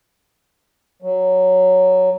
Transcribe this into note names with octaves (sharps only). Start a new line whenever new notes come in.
F#3